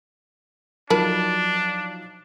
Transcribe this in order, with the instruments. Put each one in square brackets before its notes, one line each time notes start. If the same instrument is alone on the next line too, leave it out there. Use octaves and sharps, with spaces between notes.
[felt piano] F3 F#3 D#4 [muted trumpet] D4 [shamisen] A#4 A5 B5